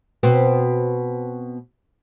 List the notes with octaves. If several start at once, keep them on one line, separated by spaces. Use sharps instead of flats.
B2 B3 C4